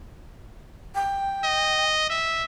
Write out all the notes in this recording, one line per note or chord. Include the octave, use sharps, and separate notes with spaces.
G5
D#5
E5